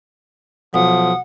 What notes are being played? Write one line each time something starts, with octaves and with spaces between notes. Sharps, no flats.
B1 F3 F#5 D#6